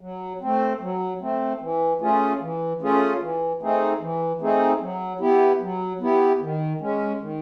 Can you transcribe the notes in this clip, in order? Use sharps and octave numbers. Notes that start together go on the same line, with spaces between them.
F#3
A3 C4
F#3
A3 C4
E3
A3 C#4 F4 G#4
E3
A3 C#4 F4 G#4
E3
A3 C4 D#4 G#4
E3
A3 C4 D#4 G#4
F#3
B3 E4 G4
F#3
B3 E4 G4
D#3
G#3 C#4
D#3